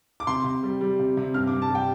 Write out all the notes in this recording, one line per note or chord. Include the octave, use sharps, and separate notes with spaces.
D6
C3 C6
C3
G3
G3
C3
C3
G2 F6
D6
G2
A5
G3
G5